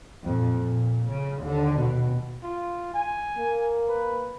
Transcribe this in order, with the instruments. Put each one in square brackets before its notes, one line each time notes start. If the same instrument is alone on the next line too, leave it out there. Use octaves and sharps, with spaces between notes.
[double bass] F2 A#2
A#2
C#3
D#2 D3
B2
[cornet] F4
G#5
[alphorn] A#3
[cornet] B4